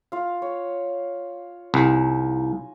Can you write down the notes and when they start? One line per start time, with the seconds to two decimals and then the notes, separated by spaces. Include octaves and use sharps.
0.12 F4 F5
0.42 C#5
1.74 C2 D#4 G#5